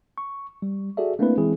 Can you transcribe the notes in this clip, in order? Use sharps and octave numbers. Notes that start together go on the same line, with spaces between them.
C#6
G3
F#4 G#4 A4 D5 E5
A3 A#3 C4 D4 E4 B4
E3 G#3 C4 E4 G#4